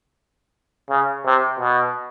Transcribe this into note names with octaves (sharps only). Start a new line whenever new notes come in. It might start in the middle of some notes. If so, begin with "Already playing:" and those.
C#3
C3
B2